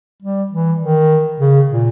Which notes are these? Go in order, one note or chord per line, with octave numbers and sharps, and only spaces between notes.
G3
E3
D#3
C#3
A#2